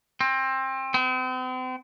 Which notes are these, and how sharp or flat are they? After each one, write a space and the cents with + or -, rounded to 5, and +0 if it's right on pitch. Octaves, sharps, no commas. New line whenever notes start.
C4 +25
C4 -40